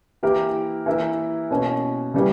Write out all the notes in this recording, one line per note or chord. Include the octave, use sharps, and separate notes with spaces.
E3 A#3 E4 G4 A#4
E3 A#3 E4 A#4
B2 A#3 C#4
C#3 E3 G3 A#3